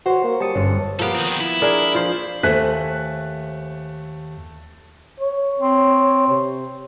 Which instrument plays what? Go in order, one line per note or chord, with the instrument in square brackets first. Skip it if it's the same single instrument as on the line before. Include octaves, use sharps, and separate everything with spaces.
[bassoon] F#4 [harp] C5 C#5
[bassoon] A#3
[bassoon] G3 [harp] A5 D#6 C#7
[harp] G1 [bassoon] C#4
[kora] F3 A#3 B3 [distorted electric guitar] G4 A4
[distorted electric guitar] D#3 C4
E4
[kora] D4 G#4 A#4
F3 C5
[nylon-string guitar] D#2 C5 G#5 [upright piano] A3 F#6 B6
[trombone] C#5
[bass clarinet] C4
[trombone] C3